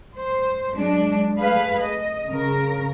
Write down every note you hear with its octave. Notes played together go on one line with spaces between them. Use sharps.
C5
F#3 G#3 D4
A3 G#4 B4 F5
D#5
C#3 A#4